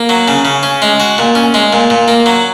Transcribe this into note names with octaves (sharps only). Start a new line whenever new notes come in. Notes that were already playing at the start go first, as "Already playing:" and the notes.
Already playing: A#3
F#3
C#3
C#3
C#4
G#3
F#4
A#2
C#4
G#3
A#2
A#2
A#3
F#3